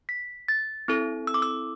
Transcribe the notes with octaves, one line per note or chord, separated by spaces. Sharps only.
B6
A6
C4 E4 A4
E6
D6
E6